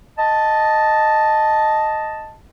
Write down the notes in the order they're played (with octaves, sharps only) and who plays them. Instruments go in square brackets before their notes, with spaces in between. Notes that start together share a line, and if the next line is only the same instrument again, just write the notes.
[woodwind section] D#5 A5